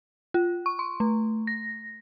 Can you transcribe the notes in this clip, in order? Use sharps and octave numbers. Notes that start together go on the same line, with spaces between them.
F4
C#6
C6
A3
A#6